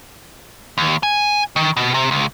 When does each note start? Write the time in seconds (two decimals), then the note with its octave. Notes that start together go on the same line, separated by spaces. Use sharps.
0.78 D#2
1.03 G#5
1.56 D#3
1.77 B2
1.94 C3
2.11 C#2